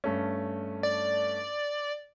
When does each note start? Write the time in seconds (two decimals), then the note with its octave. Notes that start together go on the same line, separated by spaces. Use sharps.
0.04 G2 A3 C#4
0.83 D5